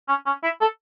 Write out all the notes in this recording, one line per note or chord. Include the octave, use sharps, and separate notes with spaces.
C#4
C#4
E4
A4